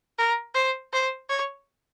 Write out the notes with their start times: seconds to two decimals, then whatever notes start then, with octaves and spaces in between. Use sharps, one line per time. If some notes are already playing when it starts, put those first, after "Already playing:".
0.19 A#4
0.55 C5
0.93 C5
1.29 C#5